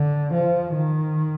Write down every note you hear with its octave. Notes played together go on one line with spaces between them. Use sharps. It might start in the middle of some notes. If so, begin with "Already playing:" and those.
Already playing: D3
F3
D#3